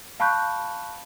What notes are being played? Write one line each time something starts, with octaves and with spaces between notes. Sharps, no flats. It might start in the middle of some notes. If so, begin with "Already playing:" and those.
F5 A5 B5 C#6 F#6 G6